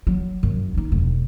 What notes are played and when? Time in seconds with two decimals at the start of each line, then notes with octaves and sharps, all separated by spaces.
0.07 F#3
0.43 F#2
0.74 D4 D#4
0.92 E1